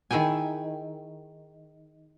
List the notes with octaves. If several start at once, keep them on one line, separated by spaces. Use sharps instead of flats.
D#3 E4 G#4 G5 G#5